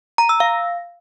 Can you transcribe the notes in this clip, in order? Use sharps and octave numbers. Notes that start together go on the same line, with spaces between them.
A#5
E6
F5